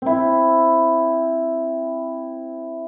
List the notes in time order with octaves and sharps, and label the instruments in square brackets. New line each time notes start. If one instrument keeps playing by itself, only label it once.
[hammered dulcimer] C4 E4